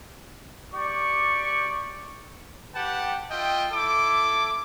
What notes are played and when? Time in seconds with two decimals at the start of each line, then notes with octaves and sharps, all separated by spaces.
0.74 G4 D5 C#6
2.74 G4 B4 F#5 G5 A5
3.30 F4 D#5 E5 G5
3.72 E4 A4 D6